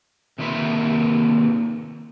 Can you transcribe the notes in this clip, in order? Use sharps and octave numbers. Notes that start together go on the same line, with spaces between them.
C3 D#3 A#3 F4 B4 E5